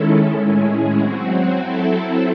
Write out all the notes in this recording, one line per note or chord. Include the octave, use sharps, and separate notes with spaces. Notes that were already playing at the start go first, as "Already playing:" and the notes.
Already playing: D#3 G#3 C#4 E4 A4
A2 G#3 C#4 E4 G#4
F#3 C4 F#4
F#3 C4 E4 A4